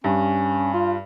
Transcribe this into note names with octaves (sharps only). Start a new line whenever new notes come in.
G2 C#4
F4